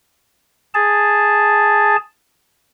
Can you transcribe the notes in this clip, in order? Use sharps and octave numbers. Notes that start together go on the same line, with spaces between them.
G#4 A5